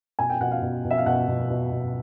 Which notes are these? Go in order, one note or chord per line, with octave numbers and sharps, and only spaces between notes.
B2 G#5
G5
B2 F#5
F5
B2
B2
E5
F5
B2 F#5
B2
B2
B2